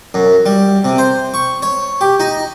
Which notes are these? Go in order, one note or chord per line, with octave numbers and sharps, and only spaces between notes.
F#2
G3
C3
C5
C#6
C#5
G4
D#4